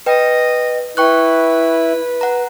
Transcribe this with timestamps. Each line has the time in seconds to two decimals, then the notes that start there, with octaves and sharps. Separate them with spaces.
0.06 B4 D#5 G5
0.97 E4 B4 G5 C#6 F#6
2.21 F#5 A#5